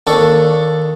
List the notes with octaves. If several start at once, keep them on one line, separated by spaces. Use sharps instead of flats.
D#2 D4 A4 C#6